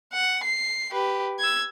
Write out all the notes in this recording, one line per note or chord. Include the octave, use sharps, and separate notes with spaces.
F#5
C7
G4 B4
E6 G#6